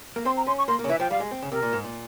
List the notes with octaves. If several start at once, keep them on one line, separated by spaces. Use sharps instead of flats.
A#3
C4 C6
A#5
C#4 C6
C#6
A#3 C6
A#3
C#3
E3 E5
F3 G5
G3 F5
G#3
C4
C#3
C3 A#4
A#2
G#2
A#2